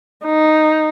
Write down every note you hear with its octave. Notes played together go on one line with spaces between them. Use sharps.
D#4